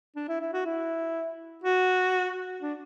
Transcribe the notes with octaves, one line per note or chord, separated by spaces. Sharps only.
D4
E4
E4
F#4
E4
F#4
D4